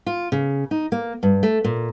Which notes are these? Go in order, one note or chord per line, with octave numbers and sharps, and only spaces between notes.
F4
C#3
D#4
A#3
G2
A3
A#2